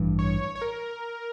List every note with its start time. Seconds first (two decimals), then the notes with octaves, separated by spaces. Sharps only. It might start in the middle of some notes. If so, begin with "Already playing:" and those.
Already playing: A1 G2 E3
0.19 C#5
0.55 C#5
0.61 A#4